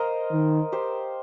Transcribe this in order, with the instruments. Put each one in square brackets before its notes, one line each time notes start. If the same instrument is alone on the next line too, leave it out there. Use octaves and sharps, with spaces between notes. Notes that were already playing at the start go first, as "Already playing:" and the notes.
Already playing: [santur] A#4 C5 D#5 F5
[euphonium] D#3
[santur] G4 C5